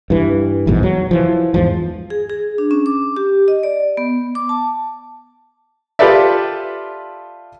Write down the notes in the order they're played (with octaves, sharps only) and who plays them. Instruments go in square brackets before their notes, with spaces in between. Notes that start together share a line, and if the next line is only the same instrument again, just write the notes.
[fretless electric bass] G2 E3
A#1 E2 G#2 B2
F#3
E3 F3
E2 G#2 F3
[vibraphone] G#4
G#4
D4
C#4
D6
G4
D#5
D5
B3
D6
A5
[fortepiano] F4 G4 A4 B4 D5 E5